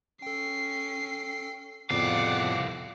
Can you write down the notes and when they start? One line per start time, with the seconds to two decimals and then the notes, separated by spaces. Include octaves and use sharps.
0.22 C#4 A4 G5 C7
1.90 C2 F2 A2 C#3 B3 D5 F5 F#5